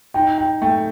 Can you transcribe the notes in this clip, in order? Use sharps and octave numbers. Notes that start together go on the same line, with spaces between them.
D#4 G5
G5
A3 G5